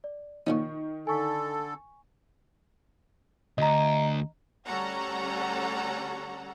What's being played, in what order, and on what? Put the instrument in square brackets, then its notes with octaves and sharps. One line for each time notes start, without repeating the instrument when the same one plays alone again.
[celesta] D5
[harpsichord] A#2 F3 C#4 [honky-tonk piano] D#3 [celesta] D#5 C#6
[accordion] D3 A4 [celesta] G#5 C#6 B6
[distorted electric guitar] D2 [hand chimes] D#5 A#5
[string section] D2 G3 C#4 A4 F#5 A#5